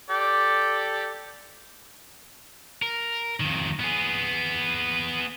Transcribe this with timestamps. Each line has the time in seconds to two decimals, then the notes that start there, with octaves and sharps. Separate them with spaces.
0.10 G4 A4 D5
2.82 A#4
3.40 F2 D#3
3.80 B3 G#4